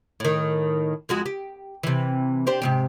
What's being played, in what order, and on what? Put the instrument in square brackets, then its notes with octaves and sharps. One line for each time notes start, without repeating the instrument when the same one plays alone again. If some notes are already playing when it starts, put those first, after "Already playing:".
[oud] A2 D#3
F2 G#3 F#4
G4
C3 E3
D4 G4 C5
G#2 C3 G4